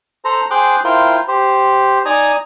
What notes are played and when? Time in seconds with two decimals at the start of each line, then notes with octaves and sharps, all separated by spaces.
0.25 A4 C5 A#5
0.51 G#4 C5 G5 D6 F#6
0.84 E4 F4 A#4 C5 G5
1.28 G4 C5
2.05 D#4 D5 G#5 A#5 D#6